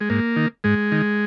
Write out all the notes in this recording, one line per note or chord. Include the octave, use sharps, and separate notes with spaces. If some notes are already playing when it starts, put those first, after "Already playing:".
G#3
G#2 A#3
D#3
G#2 G#3
D#3